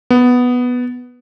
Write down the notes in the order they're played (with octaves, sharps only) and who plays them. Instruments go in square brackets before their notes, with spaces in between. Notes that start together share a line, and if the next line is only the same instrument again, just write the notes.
[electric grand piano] B3